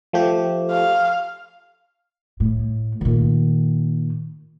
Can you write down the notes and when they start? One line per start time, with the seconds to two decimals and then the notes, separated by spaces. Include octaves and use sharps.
0.13 F3 A3 G4
0.71 F5
2.40 A2
3.01 A#2 D#3